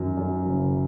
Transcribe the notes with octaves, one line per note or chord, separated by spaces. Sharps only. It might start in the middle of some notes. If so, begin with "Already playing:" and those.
Already playing: F#2 D#3 F#3
F#2
F#1